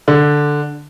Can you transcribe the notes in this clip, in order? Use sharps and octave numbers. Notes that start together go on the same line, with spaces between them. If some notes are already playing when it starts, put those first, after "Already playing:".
D3